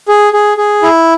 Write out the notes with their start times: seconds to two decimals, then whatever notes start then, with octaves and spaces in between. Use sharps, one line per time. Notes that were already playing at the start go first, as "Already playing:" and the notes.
0.08 G#4
0.33 G#4
0.57 G#4
0.83 E4